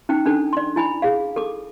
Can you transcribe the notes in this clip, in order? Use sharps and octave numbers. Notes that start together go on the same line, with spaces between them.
C#4 D#4 G5
C#4 D4 A4
D5 C6
E4 G#5 B5
G#4 F5
A4 D6